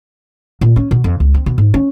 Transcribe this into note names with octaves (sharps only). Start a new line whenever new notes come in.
A#2
C#4
B2
F2
C#2
C4
B2
G#2
C#4